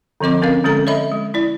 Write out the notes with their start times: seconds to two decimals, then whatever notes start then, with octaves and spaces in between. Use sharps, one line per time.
0.21 D3 F3 C4 D#5 D6
0.42 C4 C#4 A#4 F5
0.64 D3 G#3 C#4 A4 A#5
0.87 C#5 D#5 E5 B5
1.12 G#3
1.34 E4 D5